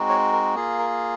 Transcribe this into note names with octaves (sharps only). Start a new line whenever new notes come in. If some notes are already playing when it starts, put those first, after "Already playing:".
Already playing: G#3 C4 D#4 F#4
C#5
A#4
A#3 F4 G#4
A#4